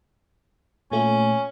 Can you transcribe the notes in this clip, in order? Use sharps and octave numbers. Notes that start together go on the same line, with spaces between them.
A#2 A3 C#4 F4